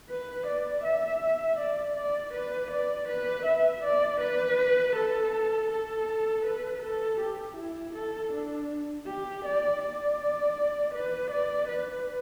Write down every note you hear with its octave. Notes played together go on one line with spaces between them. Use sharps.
B4
D5
E5
D5
D5
B4
D5
B4
E5
D5
B4
A4
A4
B4
A4
G4
E4
A4
D4
G4
D5
D5
B4
D5
B4